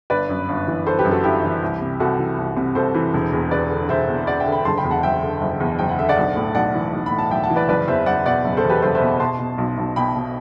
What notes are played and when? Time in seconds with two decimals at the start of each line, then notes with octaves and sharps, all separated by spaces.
0.10 G1 B4 D5
0.29 F#2
0.49 G1
0.67 E3
0.86 G1 A4 C5
0.99 G4 B4
1.05 F#2
1.11 F#4 A4
1.24 G1 E4 G4
1.43 E3
1.62 C2
1.81 C3
2.00 C2 F#4 A4
2.19 E3
2.38 C2
2.57 C3
2.75 C2 A4 C5
2.94 E3
3.14 E1
3.33 E2
3.51 E1 B4 D5
3.70 D3
3.89 E1 C5 E5
4.08 E2
4.27 E1 D5 F#5
4.40 E5 G5
4.46 D3
4.52 G5 B5
4.65 F#1 A5 C6
4.78 G5 B5
4.84 E2
4.91 F#5 A5
5.03 F#1 E5 G5
5.22 D3
5.41 F#1
5.60 E2
5.79 F#1 G5
5.89 F#5
5.98 D3 E5
6.09 D5 F#5
6.17 B1
6.36 A2
6.55 B1 D5 F#5
6.74 E3
6.93 B1
7.06 B5
7.11 A2
7.18 A5
7.30 B1 E5 G5
7.43 F#5 A5
7.50 E3
7.56 B4 D5
7.69 F#1 B4 D5
7.88 E2 C5 E5
8.06 F#1 D5 F#5
8.25 B2 D5 F#5
8.45 F#1
8.57 A4 C5
8.64 E2
8.70 G4 B4
8.82 F#1 A4 C5
8.95 C5 E5
9.01 B2
9.20 B2 A5 C6
9.39 B2
9.58 B1
9.78 B1
9.96 B2 G5 B5
10.16 B2